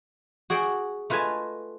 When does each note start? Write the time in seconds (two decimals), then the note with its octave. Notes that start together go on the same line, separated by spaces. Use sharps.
0.50 F#4 G#4 D5 F#5 G5
1.10 A3 F4 B4 D#5 G#5 A5